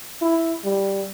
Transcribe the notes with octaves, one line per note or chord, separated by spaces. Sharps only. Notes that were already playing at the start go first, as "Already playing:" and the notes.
E4
G3